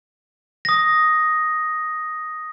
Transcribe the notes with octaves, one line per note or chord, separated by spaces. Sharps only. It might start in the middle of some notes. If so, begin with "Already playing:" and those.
D#6 A#6